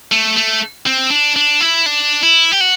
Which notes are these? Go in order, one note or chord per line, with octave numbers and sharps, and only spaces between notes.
A3
A3
C4
D4
D4
E4
D4
E4
G4
F#4